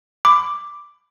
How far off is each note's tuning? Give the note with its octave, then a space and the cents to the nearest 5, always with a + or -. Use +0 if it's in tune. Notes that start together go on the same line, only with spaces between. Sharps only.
B5 +25 D6 +0